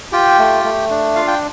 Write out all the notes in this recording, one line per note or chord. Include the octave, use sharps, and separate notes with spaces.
F4 G4 G5
A3
A3
D4
F4 F5
G5